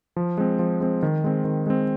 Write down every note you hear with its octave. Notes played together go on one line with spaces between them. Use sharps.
F3
G#3 C4
F3
G#3 C4
D#3
G#3 C4
D#3
G#3 C4